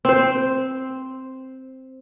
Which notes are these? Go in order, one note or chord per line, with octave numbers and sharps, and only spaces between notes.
C4 C5